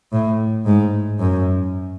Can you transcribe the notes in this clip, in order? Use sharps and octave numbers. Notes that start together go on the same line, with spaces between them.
A2
G#2
F#2